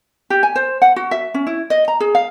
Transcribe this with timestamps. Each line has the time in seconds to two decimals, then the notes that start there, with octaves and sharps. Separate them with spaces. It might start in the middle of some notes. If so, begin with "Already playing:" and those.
0.30 G4
0.43 G#5
0.56 C5
0.82 F#5
0.96 F#4
1.11 E5
1.34 C#4
1.47 E4
1.70 D#5
1.88 A#5
2.00 G#4
2.15 F5